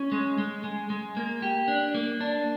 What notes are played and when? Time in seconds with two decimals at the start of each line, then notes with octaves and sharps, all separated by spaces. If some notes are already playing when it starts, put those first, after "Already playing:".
Already playing: C#4
0.12 G#3
0.38 G#3
0.64 G#3
0.90 G#3
1.17 A#3
1.42 G4
1.68 D4
1.95 A#3
2.21 D4